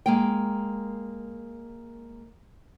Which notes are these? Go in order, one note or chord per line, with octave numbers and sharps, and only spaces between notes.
G#3 A#3 G5